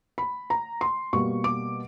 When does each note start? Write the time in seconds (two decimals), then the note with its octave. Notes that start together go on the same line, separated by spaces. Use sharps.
0.18 B5
0.50 A#5
0.81 C6
1.13 B2 G3 A#3 C#6
1.44 D6